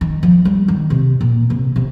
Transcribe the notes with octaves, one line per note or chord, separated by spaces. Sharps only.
D#3
F3
G3
D#3
C3
A#2
C3
C3